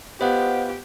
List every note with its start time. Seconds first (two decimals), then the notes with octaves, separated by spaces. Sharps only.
0.21 B3 F4 G4 C5 D#5 F#5